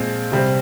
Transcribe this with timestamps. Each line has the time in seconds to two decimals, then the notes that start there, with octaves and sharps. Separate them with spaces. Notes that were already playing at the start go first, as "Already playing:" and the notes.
Already playing: A#2 F3 G#3 C4
0.32 C3 G3 C4